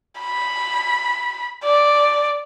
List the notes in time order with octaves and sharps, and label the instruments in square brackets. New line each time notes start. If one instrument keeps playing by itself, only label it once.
[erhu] B5
D5